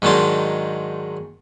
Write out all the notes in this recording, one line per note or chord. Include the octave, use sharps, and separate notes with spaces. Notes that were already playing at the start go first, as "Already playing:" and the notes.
G#2 D#3 F#3 D4 A5 C6